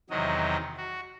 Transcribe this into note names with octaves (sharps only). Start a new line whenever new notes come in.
E2 C3 D#3 F#3 D#5
F#4